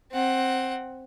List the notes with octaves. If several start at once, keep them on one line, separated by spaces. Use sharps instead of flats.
C4 F#5